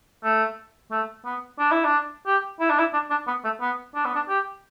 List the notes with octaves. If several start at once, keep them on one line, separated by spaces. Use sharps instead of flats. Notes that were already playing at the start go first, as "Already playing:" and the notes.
A3
A3
B3
D4
E4
D4
G4
E4
D4
E4
D4
D4
B3
A3
B3
D4
B3
D4
G4